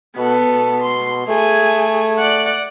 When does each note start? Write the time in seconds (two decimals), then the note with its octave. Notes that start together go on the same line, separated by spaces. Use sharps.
0.16 B2 B3 A4
0.47 B2
0.82 C6
1.28 A3 G#4 G#5
2.19 D5 F#5